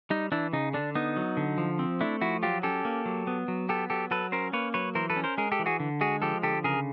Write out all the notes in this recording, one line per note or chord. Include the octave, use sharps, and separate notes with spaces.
G3 D#4
E3 D4 E4
C#3 D#4
D3 D4
B3 D#4
F#3
D3
F3
C4
A3 D4 E4
F3 E4 F#4
F#3 F4 G4
C#4 G4 A4
A#3
F#3
B3
F#3
B3 G4 A4
F#3 G4 A4
F#3 A4 B4
C#4 A#4 C5
A#3 B4 C#5
F#3 B4 C#5
E3 A#4 C5
A4 B4
C#4
A#4 C5
G#3 G#4 A#4
G4 A4
E3
F#4 G#4
D3
G#3 F#4 G#4
F3 G4 A4
D3 G4 A4
C#3 G#4 A#4